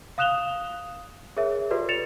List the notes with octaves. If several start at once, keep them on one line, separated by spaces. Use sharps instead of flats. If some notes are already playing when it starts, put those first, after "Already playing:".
F5 D#6 F#6 E7 F7 G7
G#4 A#4 C#5 E5
F4 G4 A4 B4 D5
A6 C#7 E7 F7